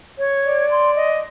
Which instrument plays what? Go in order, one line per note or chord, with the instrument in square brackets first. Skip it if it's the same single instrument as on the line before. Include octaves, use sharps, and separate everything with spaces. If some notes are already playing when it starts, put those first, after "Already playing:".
[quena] C#5
[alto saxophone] D5
[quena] C6
D#5